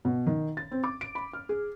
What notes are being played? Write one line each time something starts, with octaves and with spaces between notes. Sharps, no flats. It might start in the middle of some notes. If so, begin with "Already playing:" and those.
B2
D#3
A6
C4
D6
D7
B5
F6
G#4